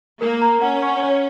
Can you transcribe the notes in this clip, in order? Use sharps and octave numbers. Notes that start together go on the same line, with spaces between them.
A#3 A#4
A#5
C#4 F#5
C#6
C#5